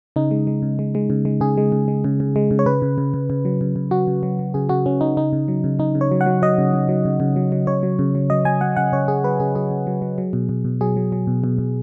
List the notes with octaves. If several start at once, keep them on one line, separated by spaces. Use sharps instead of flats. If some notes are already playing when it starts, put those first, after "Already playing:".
C#3 D#4
G#3
G#3
C#3
G#3
G#3
C#3
G#3
C#3 G#4
G#3
C#3
G#3
C#3
C#3
G#3
C#3
C#5
C#3 B4
C#3
C#3
C#3
C#3
F#3
C#3
C#3
F#3 F#4
C#3
F#3
F#3
C#3 G#4
C#3 F#4
C#3 C#4
C#3 D#4
C#3 D#4
C#3
F#3
C#3
C#3 D#4
C#3
C#5
F#3
F#5
F#3
F#3 D#5
C#3
C#3
F#3
C#3
C#3
F#3
F#3
C#3 C#5
F#3
C#3
F#3
F#3 D#5
F#3 G#5
F#3 F#5
C#3 F#5
C#3 C#5
C#3 G#4
F#3 B4
C#3 G#4
F#3 G#4
C#3
F#3
F#3
F#3
B2
B2
B2
F#3 G#4
F#3
F#3
B2
B2
B2